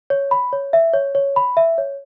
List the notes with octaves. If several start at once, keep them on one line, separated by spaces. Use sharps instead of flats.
C#5
B5
C#5
E5
C#5
C#5
B5
E5
C#5